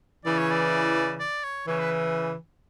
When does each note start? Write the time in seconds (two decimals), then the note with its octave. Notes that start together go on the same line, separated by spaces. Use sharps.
0.25 C#3 E3 D5
0.38 C#5
0.51 D5
1.20 D5
1.44 C#5
1.67 C#3 E3 C#5
1.79 B4